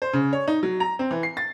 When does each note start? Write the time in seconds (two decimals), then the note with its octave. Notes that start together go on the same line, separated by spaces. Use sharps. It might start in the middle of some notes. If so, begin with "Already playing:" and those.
0.02 C5
0.13 C#3
0.33 C#5
0.48 D#4
0.63 F#3
0.80 A#5
0.99 C4
1.11 E3
1.23 C7
1.37 A6